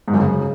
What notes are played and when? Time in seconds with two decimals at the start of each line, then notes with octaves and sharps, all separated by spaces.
0.08 G#2
0.14 F#2
0.20 C#3